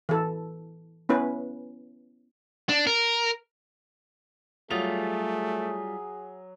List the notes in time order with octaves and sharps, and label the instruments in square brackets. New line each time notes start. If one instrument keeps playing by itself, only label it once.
[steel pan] E3 A4
B3 C#4 E4 B4
[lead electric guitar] D4
A#4
[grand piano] F#3 D#6 F7 [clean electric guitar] G3 F4 [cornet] A3 [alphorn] G#4